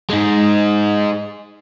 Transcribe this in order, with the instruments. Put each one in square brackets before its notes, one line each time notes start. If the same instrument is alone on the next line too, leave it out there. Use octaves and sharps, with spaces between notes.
[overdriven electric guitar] G#3 D#4